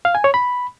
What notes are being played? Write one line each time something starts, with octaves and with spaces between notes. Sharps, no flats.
F5
G#5
C#5
B5